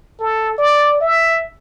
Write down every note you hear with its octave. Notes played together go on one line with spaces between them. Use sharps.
A4
D5
E5